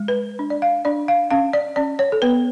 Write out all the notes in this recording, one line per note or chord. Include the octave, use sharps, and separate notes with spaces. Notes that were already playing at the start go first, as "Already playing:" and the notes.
Already playing: G#3
B4
D4
D5
F5
D4 D5
F5
C#4 F5
D5
C#4 D5
C#5
A4
B3 B4